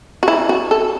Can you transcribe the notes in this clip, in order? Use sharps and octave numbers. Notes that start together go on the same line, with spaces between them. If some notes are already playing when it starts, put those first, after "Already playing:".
F#4
E4
F#4
A4